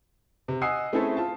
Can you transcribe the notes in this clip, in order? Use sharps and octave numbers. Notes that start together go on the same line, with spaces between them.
C3
D#5 F#5 G#5 D#6 E6 C7
A3 C4 C#4 E4 G#4 A4
F4 A5